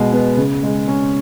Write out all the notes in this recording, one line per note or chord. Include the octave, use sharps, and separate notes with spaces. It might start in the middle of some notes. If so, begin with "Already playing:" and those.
Already playing: B2 G#3
B3
C#3
G#3
C#4